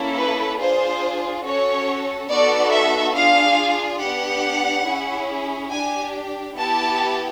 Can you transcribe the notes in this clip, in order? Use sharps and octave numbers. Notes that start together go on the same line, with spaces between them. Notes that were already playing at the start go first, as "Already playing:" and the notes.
Already playing: A#3 C#4 E4 A4
B4
D4 F4 G#4 C5
C#4 F#4 A4 C#5
B3 D#4 F#4 A4 D5
E5
D4 F4 G#4 F5
B3 D4 G4 F#5
C#4 E4 G#4
D4 G4 G#5
B3 E4 G4 A5